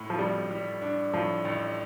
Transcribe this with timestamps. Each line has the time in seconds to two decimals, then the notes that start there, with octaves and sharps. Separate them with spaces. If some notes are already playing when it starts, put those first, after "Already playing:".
Already playing: A2
0.10 F3
0.19 A1 G3
0.51 G3
0.82 D4
1.13 A2 F3
1.45 A1